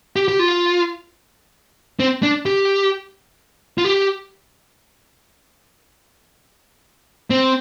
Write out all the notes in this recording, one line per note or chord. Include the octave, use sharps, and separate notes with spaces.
G4
G4
F4
C4
D4
G4
F4
G4
C4